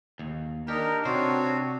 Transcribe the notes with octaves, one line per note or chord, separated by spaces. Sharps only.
D#2
D4 D#4 G4 A#4
C3 C4 D4 F#4 C5 C#5